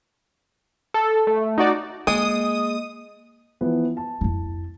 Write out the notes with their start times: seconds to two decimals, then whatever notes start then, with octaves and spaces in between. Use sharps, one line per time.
0.94 A4
1.27 A3
1.58 D#4 F#4 D5
2.07 G#3 A#3 D#5 D#6
3.61 E3 F3 B3
3.97 A5
4.21 F2 E4